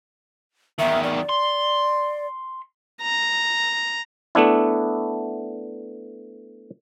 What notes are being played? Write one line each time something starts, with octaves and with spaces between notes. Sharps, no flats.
E2 D#3 E5
D5
C6
A#5
A3 B3 D4 E4